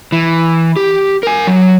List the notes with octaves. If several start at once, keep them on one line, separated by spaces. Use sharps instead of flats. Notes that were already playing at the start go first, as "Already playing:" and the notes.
E3
G4
A#4 G#5
F#3